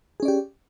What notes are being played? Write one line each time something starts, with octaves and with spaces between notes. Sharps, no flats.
C#4 G4 G#4 D5